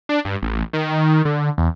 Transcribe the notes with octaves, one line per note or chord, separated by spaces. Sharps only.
D4
G2
A1
D#3
D3
E2